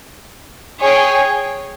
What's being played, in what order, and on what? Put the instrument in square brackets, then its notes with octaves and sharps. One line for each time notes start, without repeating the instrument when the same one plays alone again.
[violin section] G#4 C#5 G5